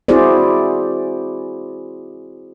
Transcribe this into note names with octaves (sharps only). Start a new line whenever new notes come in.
C4 E4 F#4 G#4 C5 D5